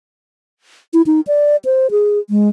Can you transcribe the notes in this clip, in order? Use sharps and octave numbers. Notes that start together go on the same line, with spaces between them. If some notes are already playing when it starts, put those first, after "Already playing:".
E4
D#4
D5
C5
G#4
G#3